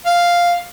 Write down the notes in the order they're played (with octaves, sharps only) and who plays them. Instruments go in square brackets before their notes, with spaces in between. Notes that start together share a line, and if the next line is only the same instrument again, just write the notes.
[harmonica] F5